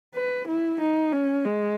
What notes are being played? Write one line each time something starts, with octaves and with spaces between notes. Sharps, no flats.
B4
E4
D#4
C#4
G#3